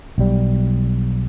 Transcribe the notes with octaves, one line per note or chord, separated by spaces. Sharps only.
B1 G3